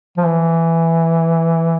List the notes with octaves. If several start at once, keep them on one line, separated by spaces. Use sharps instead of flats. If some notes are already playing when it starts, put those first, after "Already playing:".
F3
E3